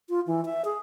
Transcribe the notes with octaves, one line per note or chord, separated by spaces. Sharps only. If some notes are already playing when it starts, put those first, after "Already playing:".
F4
E3
E5
G#4